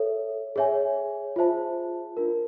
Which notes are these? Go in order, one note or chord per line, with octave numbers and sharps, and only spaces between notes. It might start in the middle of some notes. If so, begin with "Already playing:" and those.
Already playing: A4 C#5 E5
G#4 C#5 E5 G#5
F4 G#4 C5 E5 A5
D4 F4 A#4